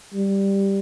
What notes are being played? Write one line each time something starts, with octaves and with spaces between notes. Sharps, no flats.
G3